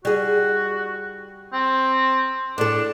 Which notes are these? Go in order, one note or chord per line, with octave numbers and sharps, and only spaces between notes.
G3 F#4 G#4
C4
A2 D4 A4